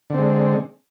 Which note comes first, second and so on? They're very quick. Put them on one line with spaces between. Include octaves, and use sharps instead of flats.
D3 C4 G#3